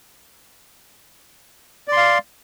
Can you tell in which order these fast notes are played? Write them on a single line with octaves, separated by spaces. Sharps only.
D5 C6 F5